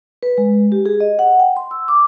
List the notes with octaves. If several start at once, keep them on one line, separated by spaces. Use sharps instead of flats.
B4
G#3
G4
G#4
D#5
F#5
G5
C6
E6
D6